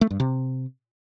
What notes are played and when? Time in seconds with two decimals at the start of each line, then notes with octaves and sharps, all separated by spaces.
0.01 A3
0.11 G2
0.20 C3